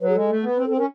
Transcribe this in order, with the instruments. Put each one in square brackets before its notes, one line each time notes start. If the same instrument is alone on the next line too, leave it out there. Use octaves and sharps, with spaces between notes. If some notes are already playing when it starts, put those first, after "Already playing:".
[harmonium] F#3 [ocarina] B4
[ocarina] G#4
[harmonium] G#3 [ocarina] A4
[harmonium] A3
B3
[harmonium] C4 [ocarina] B4
[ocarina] A4
[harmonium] C4
[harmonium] C#4 [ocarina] A#4